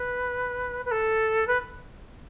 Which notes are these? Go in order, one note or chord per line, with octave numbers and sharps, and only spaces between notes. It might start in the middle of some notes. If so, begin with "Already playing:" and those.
Already playing: B4
B4
A4
B4